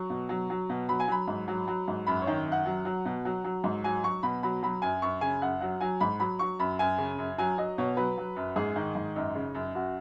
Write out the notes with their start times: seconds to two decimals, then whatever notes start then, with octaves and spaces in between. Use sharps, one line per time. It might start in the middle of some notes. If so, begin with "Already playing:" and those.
Already playing: F#3 C#6
0.10 B2
0.29 F#3
0.50 F#3
0.69 B2
0.89 F#3 B5
1.00 G#5
1.08 F#3 B5
1.28 G#2
1.48 F#3
1.68 F#3
1.88 G#2
2.07 F#2 B5
2.22 C#5
2.27 D#3
2.46 F#2
2.52 F#5
2.66 F#3
2.85 F#3
3.05 B2
3.25 F#3
3.44 F#3
3.64 G#2
3.84 F#3 G#5
4.04 F#3 C#6
4.23 B2 B5
4.43 F#3 B5
4.63 F#3 B5
4.82 F#2 G#5
5.02 F#2 C#6
5.21 C#3 G#5
5.42 F#2 F#5
5.61 F#3 F#5
5.81 F#3 G#5
6.01 G#2 B5
6.20 F#3 B5
6.39 F#3 C#6
6.59 F#2 B5
6.79 F#2 G#5
6.98 C#3
7.18 F#2
7.38 F#3 G#5
7.58 F#3 D#5
7.78 B2 C#5
7.97 F#3 B4
8.18 F#3
8.36 F#2
8.56 G#2 G#4
8.76 D#3
8.95 G#2
9.16 F#2 D#4
9.35 C#3
9.54 F#2
9.75 F#2 F#4